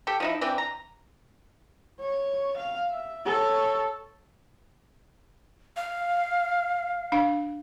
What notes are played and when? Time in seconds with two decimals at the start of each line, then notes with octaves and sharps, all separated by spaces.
0.07 G4 A4 G5
0.20 F3 D#4 E4
0.41 E3 C4 D4 G5
0.58 A#5
2.00 C#5
2.57 F5
2.90 E5
3.25 A4 C#5
5.76 F5
7.12 D4 F5